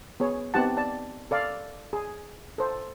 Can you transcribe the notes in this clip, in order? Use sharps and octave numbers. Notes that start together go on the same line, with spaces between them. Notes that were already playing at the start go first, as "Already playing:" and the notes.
B3 G#4 C#5
B3 C4 D#4 G4 F#5 A5
D5 A5
A4 D5 F5
G#4
A4 C5